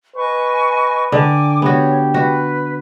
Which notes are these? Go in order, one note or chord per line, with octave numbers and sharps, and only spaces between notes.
B4 D#5 G#5 C#6
D3 G5 G#5 D6
B3 F#4 G4 C#5
F#4 B4